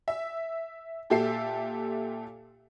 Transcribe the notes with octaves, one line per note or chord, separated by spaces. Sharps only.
E5
A#2 G4 A4 E5 C7